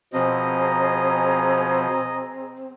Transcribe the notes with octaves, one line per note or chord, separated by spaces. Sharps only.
B2 F3 C4 G#4 D#5 A#5